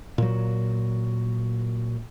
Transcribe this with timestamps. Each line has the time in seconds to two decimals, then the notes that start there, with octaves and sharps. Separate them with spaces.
0.18 A#2 F#3